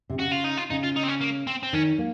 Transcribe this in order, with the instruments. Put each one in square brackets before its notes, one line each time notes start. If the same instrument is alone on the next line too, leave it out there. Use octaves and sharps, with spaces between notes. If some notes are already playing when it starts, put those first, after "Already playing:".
[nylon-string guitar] C3
[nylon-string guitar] C#3 [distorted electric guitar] F#4
[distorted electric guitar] F4
D#4
F4
[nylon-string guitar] C#3 [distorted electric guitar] D#4
[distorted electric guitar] F4
D#4
C4
C#4
A#3
C4
C4
[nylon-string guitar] D#3 [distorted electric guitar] C#4
[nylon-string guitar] A#3